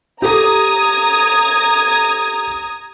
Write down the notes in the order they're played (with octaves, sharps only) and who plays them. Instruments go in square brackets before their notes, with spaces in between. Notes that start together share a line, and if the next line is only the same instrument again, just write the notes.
[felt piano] G4 A4 [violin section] A#5 D#6 G#6